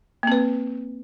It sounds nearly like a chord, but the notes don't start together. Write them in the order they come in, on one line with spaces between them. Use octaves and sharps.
A#3 C4 B4